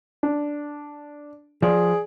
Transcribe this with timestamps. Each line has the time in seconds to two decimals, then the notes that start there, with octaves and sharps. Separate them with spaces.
0.23 D4
1.62 F3 G#4 D5